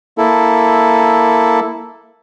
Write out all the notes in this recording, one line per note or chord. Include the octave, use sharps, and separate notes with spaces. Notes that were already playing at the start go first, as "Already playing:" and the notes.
A#3 E4 A4